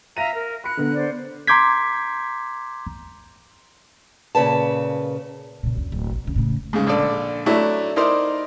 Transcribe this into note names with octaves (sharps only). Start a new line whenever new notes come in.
E5 F5 A#5 A#6 D#7
A#4
B5 F#6 C#7
D3 B3
C5 D5
A#5 C6 D6 G6 G#6 B6
A#2 C#3 B4 A5
A#2 C#3
F#1 D2
D1
A1
E2 C#3
A2 C#3
G#2 C#3
A#1 D3 A4 D5
F#3 A3 D4 E4
D#4 E4 A#4 C5 D5